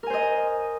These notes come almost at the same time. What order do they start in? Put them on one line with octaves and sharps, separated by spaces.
A#4 G#5 C5 D#5